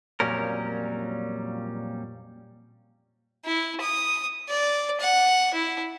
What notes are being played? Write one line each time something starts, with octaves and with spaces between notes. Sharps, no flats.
F2 A#2 F#3 G3 C#4 A#4
E4
D#6
D5
F#5
E4